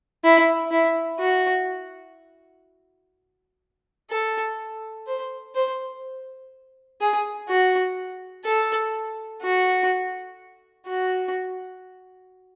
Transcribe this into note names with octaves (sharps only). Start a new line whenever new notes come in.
E4
E4
F#4
A4
C5
C5
G#4
F#4
A4
F#4
F#4